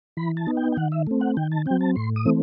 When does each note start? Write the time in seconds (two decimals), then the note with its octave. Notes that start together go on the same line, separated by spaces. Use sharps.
0.17 E3 B5
0.37 A5
0.47 B3 D#4
0.57 G5
0.72 G5
0.77 D#3 F#5
0.92 E5
1.07 A3 C4
1.21 F#5
1.37 D#3 G5
1.52 A5
1.66 F#3 C4 G5
1.81 A5
1.96 A2 C6
2.16 D#6
2.25 E3 A3 C4